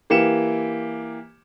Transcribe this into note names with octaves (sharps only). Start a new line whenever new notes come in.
E3 A#3 G4 C#7 E7